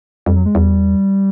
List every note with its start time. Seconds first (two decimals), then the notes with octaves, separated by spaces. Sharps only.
0.26 F2 G3
0.36 F#3
0.46 G#3
0.55 E2 G3